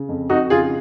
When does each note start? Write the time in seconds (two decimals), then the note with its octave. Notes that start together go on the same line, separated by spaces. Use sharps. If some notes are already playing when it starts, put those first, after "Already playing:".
Already playing: C#3
0.09 F2
0.29 F2 D#4 F#4
0.50 C#3 F4 G#4